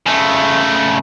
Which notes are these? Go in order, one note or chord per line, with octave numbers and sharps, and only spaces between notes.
C#3 A3